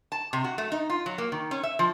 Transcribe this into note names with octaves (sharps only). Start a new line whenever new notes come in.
A5
C3
F#4
A3
D#4
F4
F#3
A#3
D#3
C#4
E5
F3